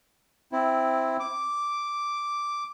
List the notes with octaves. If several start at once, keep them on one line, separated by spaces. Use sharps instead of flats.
C4 E4
D6